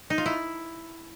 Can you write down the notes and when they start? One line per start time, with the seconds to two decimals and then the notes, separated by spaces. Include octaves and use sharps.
0.10 D#4
0.18 F4
0.26 E4